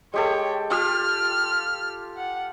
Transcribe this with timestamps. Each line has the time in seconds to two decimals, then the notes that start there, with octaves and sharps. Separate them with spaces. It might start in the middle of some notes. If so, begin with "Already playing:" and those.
0.14 G#3 G4 A4 C#5 G5
0.71 F4 G4 F6
2.17 F#5